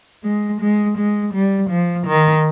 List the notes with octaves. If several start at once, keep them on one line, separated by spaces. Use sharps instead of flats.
G#3
G#3
G#3
G3
F3
D#3